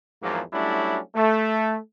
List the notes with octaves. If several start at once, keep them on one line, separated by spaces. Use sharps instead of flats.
E2 G#2 F3 F#3 A#3
F#3 G3 A3 C#4 D4 E4
A3